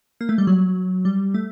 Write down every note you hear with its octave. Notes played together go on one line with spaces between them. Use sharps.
A#3
A3
G3
F#3
G3
A3